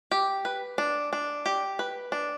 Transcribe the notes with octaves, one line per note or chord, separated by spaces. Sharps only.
G4
B4
D4
D4
G4
B4
D4